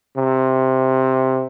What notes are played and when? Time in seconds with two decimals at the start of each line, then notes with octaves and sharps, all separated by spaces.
0.17 C3